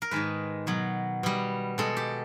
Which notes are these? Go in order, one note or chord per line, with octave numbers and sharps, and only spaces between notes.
A#4
G#2 D#3 G#3 B4
B2 F#3
B2 G3
B2 G#3 A4
G4